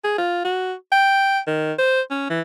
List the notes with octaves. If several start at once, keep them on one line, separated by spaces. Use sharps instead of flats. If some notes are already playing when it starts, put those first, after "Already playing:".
G#4
F4
F#4
G5
D#3
C5
C#4
E3